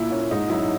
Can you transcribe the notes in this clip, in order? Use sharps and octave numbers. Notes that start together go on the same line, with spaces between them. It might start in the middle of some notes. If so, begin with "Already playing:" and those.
Already playing: A#2 E4
A#3 C#4
G#2 D#4
F#3 C#4 E4